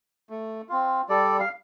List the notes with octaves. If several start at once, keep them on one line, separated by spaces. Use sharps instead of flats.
A3
C4 F4
G3 A4 D5
F5